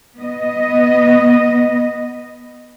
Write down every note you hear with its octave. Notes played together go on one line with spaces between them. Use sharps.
B3 D#5